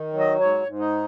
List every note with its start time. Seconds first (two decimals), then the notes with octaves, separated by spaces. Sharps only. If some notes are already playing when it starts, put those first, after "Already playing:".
Already playing: D#3
0.13 F#3
0.20 D#5
0.39 G#2 C#5
0.66 G#2
0.79 D#4